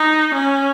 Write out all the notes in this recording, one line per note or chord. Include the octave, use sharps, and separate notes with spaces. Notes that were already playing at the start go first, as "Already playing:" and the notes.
Already playing: D#4
C#4